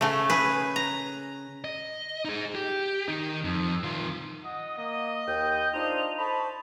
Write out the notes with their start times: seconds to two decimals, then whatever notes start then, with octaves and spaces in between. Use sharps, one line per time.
0.01 C#3 A3
0.30 G#4 B4
0.76 A#5
1.64 D#5
2.25 D#4 G#4
2.55 G4
3.08 D#3 D#4
3.44 F2
3.84 D#3 F4
4.44 D#5 F#5 D#6
4.78 A#3 D#5
5.28 D#2 G5 G6
5.74 D4 D#4 F4 C5 F7
6.19 C5 A5 B5 C#6